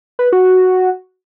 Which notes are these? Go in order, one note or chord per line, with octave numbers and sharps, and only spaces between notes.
B4
F#4